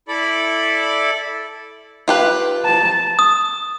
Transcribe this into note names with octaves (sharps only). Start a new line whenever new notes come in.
E4 A4 D5 B5
F4 G4 B4
A5
D#6